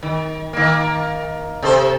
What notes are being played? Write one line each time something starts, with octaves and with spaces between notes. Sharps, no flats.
D#3
D#3 A#3
C3 A4 C5